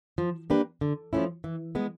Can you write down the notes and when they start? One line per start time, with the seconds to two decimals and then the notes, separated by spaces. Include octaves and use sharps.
0.18 F3
0.50 A#3 D4 G4 B4
0.81 D3
1.13 F3 A3 C#4 E4
1.44 E3
1.75 G#3 B3